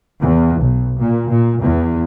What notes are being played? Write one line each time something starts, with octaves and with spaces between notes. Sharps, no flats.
E2
B1
A#2
A#2
E2